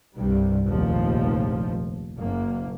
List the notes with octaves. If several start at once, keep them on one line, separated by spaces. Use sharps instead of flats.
C2 G2 C3 G3
F1 A#1 D#2 G#2 F3
F#1 F#2 A#3